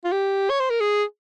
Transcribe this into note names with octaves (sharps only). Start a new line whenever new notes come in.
F4
G4
C#5
C5
A#4
G#4